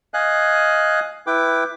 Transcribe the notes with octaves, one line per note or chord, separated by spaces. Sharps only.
D#5 F5 G#5 F#6
E4 B4 G5 D6